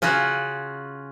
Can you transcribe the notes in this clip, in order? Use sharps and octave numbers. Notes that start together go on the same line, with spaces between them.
C#3 C#4 F4 F#4